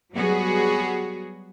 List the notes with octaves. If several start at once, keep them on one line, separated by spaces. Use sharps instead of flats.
F#3 G3 B3 F#4 G#4